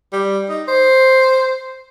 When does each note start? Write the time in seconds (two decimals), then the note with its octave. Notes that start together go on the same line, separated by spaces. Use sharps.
0.13 G3
0.49 D#4
0.68 C5